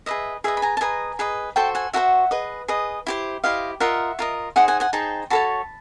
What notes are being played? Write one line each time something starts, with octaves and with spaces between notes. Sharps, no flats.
G#4 B4 D#5 E5
G#4 B4 D#5 E5
B5
G#5 A#5
A5
G#4 B4 D#5 G#5 A#5
G#4 B4 D#5
F#4 A4 C5 G5 A5
F#5 G#5
F#4 A4 C5 E5 F#5
G#4 B4 D#5
G#4 B4 D#5
E4 G4 C5
E4 G4 C5 D#5 F5
F4 A#4 D#5 E5 F#5
F4 A#4 D#5
D#4 G#4 C5 F#5 G#5
F#5 G#5
F#5 G#5
D#4 G#4 C5 G5 A5
F#4 A4 C#5 A5 B5